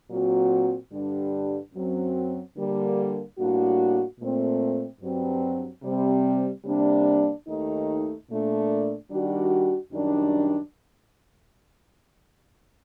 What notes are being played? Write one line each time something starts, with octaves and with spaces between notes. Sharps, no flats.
A#2 F#3 C4 F#4
G2 D3 G3 D4
F#2 F#3 C4
D3 G3 A#3
A2 G3 A#3 D4 F#4
A#2 A3 C4
G2 F#3 C4
C3 G3 C4
C3 G3 A#3 D4
D#2 D#3 A3 D#4
A#2 A3 D4
D#3 G3 D4 F#4
F#2 D#3 G3 D4